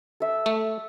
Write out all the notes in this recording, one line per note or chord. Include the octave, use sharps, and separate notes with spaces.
A4 E5
A3